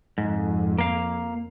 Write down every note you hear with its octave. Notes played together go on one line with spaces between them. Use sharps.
F2 G#2
A#3 F5